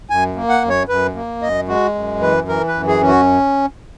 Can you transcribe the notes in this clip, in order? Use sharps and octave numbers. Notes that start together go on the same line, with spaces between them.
F#2 G#5
A#3
F#5
F#2
C#5
F#2 B4
A#3
F#2 D#5
G#3 F#4
F#2
E3 B4
E3 A#4
B4
F#2
G#4
C#4
F#4